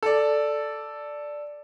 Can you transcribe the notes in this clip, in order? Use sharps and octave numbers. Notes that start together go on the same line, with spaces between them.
A4 D5